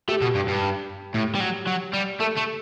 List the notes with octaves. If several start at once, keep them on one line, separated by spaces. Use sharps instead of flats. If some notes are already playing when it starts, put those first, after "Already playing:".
A3 G4
B2
G2
G2
A2
G3
F#3
F#3
G3
A3 A4
A3